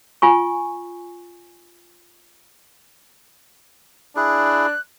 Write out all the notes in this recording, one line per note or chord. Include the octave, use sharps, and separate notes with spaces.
F4 G#5 C#6
D4 E4 G#4 F#6